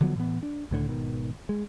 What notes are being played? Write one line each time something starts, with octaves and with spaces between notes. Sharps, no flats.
D3 F3 F#3 B3
A2 E3 B3
D4
C#2 A2 D3
G#1 B2 D#3
G#3